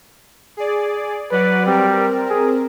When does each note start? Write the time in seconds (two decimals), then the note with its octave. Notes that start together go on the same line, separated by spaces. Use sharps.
0.57 G#4 D5
1.31 F#3 B4 D5 F#5
1.66 G3 C4 A#4
2.30 G#4